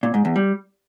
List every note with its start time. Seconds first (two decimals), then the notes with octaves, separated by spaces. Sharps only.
0.03 A#2
0.14 G#2
0.25 E2
0.36 G3